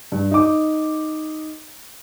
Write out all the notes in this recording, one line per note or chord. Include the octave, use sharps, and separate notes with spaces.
G2
D#4 D6